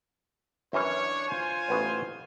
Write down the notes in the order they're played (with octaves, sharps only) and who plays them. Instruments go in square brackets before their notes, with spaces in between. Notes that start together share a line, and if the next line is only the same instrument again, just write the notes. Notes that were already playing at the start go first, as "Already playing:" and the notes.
[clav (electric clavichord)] F#2 E3 C#4 [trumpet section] D4 C#5
[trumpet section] F4 C5 G#5
[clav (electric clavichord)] A1 B3 C#5